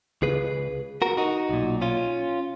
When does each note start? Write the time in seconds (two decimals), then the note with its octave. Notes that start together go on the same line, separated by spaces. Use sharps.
0.22 C#2 C#3 G#4 B4
1.02 F#4 A#4
1.17 D#4 F#4
1.49 B1 A#2
1.82 C#4 F4